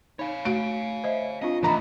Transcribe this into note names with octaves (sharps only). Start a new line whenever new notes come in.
D#4 C#5 F5
A3 F#4 D7
C5 D#5 E5
C4 D4 F4 D#5
E3 A3 D#5 A#5 B5